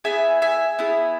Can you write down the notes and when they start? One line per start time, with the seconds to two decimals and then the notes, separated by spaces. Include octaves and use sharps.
0.04 B3 E4 G#4 E5 G#5
0.42 E5 G#5
0.79 B3 E4 G#4